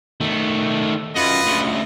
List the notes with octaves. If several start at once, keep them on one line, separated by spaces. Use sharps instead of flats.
D#3 A3
F#2 F4 B4 D#5
D2 C#3